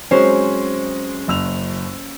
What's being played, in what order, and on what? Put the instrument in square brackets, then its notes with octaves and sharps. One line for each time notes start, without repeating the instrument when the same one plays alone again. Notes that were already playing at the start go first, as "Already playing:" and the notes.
[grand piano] F#3 G#3 C4 [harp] C#4 C5
[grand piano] F#1 E6 F7